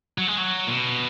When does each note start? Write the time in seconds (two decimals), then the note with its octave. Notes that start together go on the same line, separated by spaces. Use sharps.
0.18 F#3
0.28 G#3
0.38 F#3
0.67 A#2
0.72 B2